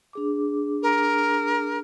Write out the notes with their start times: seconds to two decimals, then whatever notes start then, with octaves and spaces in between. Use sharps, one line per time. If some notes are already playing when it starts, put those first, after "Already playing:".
0.13 D4 G#4 D6
0.82 A#4